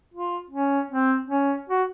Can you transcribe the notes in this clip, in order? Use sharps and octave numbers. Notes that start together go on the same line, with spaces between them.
F4
C#4
C4
C#4
F#4